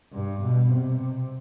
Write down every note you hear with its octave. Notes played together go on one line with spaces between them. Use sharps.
G2
B2
C3